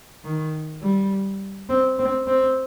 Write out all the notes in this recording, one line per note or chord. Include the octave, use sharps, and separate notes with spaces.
D#3
G3
C4
C4
C4